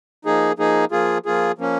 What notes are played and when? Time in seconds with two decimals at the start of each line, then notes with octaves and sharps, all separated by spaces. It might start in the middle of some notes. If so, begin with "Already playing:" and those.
0.25 F3 A#3 D#4 G#4
0.58 F3 A#3 D#4 G#4
0.91 F3 A#3 F4 G#4
1.25 F3 A#3 F4 G#4
1.58 F3 A#3 C#4